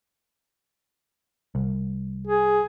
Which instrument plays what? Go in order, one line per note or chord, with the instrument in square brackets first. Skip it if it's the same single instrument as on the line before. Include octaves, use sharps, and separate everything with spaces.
[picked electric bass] C2
[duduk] G#4